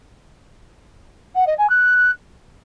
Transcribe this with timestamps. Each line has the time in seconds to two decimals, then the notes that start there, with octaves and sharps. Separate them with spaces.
1.35 F#5
1.47 D#5
1.58 G#5
1.70 F#6